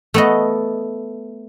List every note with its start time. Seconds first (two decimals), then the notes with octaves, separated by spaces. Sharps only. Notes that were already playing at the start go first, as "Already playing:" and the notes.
0.14 A3 B3 D#5